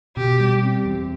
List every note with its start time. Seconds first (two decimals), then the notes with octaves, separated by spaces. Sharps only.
0.17 B2 G4
0.40 G3
0.63 C4
0.85 E2